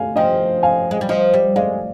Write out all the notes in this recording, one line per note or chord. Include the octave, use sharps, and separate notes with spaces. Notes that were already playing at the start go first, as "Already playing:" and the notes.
Already playing: F5 G#5
F3 D#5 G5
F5 G#5
G#3
G3
F3 D#5
G3
G#3 D5 F5